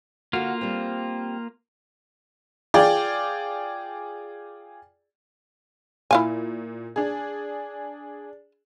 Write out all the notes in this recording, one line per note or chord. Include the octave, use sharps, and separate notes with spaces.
D3 A#3 F4 F#4
G3 C4
F4 G#4 D5 G5
A#2 E4 F5 G#5
D4 G#4